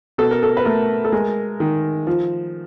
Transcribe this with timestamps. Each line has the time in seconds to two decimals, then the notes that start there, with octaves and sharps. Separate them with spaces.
0.18 B2 A4
0.31 A#4
0.43 A4
0.57 B4
0.65 A3 A#4
1.05 A4
1.12 G#3 A#4
1.60 D#3
2.07 F3